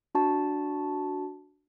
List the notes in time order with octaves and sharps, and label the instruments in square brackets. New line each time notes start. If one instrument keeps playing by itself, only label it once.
[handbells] D4 F#4 A5